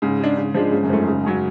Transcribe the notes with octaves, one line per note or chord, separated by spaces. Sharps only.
G#2 C#3
G#3 D4
C#3
F3 G#3 D4
G#2 C#3
F#2
G#2 F3 A3
C#3
F#3 C#4 G#4